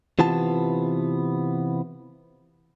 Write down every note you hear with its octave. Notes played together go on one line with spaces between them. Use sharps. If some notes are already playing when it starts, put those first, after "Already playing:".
C3 E3 B3 F4 A5